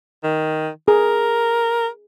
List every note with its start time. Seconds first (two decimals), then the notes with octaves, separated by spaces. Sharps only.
0.24 D#3
0.88 G#4 A#4